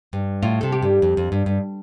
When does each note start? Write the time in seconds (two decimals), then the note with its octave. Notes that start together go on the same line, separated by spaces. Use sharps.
0.13 G2
0.42 A2 F4
0.61 C3 A4
0.72 G4
0.82 G2
1.02 F2
1.17 F2
1.32 G2
1.46 G2